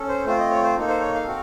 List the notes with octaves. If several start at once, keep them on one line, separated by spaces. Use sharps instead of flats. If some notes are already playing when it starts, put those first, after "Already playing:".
Already playing: C#4 A4
C5
A3 C4 F4 C5
D#5
C#5
C5
A#3 D#4 A4
C5
C#5
F5
C4 F#4 A4